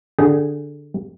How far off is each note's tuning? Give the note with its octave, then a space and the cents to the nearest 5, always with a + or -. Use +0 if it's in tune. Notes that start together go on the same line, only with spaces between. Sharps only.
D3 +0 G#4 +0 G5 -30